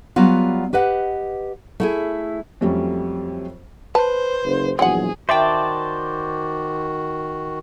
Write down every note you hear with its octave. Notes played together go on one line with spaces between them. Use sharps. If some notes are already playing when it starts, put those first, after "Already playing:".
F#3 G3 B3 F4
G4 B4 D#5 F#5
A3 E4 G#4
F2 F#3 G3 A3 C#4
B4 C5 A5
F#1
A#1 E2 F#3 C4 G#4 F#5
D#3 F#4 C5 D5 E5 G5 A5